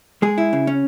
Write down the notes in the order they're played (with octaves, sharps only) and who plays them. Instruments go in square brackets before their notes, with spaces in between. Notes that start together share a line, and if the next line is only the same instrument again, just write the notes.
[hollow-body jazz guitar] G#3 G#4
E4
C#3
C#4